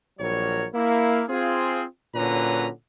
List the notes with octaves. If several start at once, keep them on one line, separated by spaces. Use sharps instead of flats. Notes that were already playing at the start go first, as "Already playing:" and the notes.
A#1 F#3 G3 A#4 C#5
A#3 E4
C4 F4 G#4
A#2 D3 F#3 C#4 B4 A#5